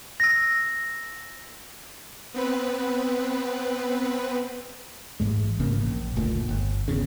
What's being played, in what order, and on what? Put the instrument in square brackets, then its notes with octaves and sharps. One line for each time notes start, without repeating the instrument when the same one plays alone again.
[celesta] E6 A#6
[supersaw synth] B3 C4 B4
[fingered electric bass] A1 G#2 G#3
A1 G#2 C#3 A#3
A#1
F#1 D2 A#2
G1
G1 E2 C#3